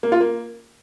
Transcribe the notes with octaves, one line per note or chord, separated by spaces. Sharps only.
A#3
F4
A#3